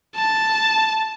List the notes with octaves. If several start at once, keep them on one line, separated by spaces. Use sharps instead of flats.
A5